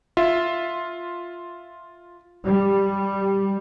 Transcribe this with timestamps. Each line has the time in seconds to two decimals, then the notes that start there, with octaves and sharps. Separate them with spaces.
0.17 F4 E5
2.43 G3